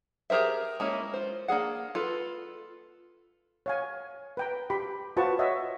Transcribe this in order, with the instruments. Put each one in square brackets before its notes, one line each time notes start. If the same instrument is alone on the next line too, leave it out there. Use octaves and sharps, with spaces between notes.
[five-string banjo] G4 G#4 A#4 C5 E5
G#3 A#3 C#4 E4
F4 C5
A#3 D4 G#4 F#5
F4 A4 B4
[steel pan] C#5 F5 G#5
B4 G5 A#5
G4 B5 C6
F4 F#4 B4 C5 A5 C#6
C#5 D#5 E5 F#5